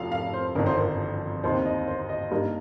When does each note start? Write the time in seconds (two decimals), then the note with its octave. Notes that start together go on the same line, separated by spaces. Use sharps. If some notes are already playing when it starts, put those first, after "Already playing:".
Already playing: F1 F2 F3 F5
0.12 F5
0.34 C5
0.55 G1 F2 D#3 A#4
0.66 C5
0.78 A#4
1.43 D#2 D#3 C4 D#4 C5
1.65 D#5
1.88 C5
2.09 D#5
2.31 G2 G3 A#3 D#4 A#4